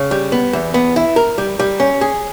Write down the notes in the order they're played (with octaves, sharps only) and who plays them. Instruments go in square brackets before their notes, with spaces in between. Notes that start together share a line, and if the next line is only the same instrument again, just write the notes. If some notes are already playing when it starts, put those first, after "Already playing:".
Already playing: [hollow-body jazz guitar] C#3
G3
B3
E2
B3
E4
A#4
G3
G3
C#4
G#4